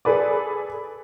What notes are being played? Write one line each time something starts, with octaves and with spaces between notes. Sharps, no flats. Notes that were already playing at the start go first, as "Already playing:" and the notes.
G#4 A4 B4 D5